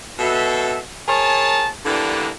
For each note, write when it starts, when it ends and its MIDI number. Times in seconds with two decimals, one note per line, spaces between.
0.19 0.79 47
0.19 0.79 69
0.19 0.79 76
1.08 1.69 68
1.08 1.69 70
1.08 1.69 73
1.08 1.69 81
1.86 2.30 50
1.86 2.30 52
1.86 2.30 55
1.86 2.30 58
1.86 2.30 59
1.86 2.30 62